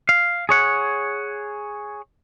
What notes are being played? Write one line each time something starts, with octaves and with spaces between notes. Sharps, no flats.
F5
G#4 C#5 F#5